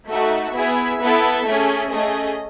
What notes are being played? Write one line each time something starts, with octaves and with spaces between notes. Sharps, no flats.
A3 D#4 F#4 A4 E5
B3 E4 G#4 E5
B3 E4 A4
A3 C#4 G#4
A3 C#4 G#4 D#5